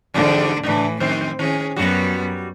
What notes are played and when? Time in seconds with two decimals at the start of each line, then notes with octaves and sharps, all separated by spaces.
0.14 E2 G#2 D3 G3 D4
0.63 A2 C#3 E3 D4
1.00 F2 D#3 C4 C5
1.39 D#3 C#4 G#4
1.76 F#2 G3 B3 F#4